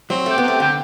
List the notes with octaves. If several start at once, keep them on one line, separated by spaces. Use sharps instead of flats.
F#3 C4
A3 G4
C3 B3
A3
D3 G4